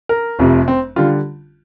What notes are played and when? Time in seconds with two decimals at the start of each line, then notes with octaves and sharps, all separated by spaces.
0.09 A#4
0.39 F1 F2 C3
0.68 C4
0.96 D3 G3 F4